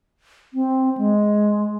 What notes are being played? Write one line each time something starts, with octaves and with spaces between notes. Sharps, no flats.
C4
G#3